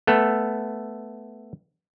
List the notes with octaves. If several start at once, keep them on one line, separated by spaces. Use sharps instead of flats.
A3 B3 A4